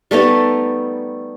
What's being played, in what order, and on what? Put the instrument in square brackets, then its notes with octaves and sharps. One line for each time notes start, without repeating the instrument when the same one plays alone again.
[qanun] G3 A3 B3 D#4